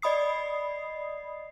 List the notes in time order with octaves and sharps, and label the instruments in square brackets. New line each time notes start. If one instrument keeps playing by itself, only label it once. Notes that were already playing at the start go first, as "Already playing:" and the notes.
[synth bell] D5 D#5 B5 D#6 C7